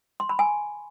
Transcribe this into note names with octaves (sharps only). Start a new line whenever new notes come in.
C6
B5
G#5